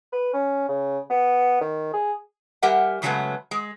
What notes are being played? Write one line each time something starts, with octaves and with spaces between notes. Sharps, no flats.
B4
C#4
C#3
B3
D#3
G#4
G3 G4 A#4 E5 F#5 G#5
F#2 C#3 F#3 G#3 A3 B3
G#3